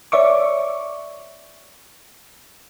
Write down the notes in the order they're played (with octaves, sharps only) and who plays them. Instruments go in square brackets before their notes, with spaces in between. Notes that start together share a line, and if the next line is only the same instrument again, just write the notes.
[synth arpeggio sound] C#5 D5 E5 C#6 D6